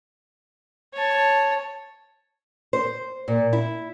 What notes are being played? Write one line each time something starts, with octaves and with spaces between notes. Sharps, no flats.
C#5 A5
C5
A#2
E4